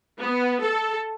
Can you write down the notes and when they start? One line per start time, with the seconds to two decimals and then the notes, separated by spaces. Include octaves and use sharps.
0.21 B3
0.63 A4